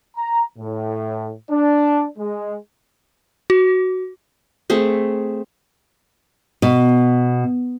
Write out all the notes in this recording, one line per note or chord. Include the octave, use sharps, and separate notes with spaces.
A#5
A2
D4
G#3
F#4
A3 C4 G#4
B2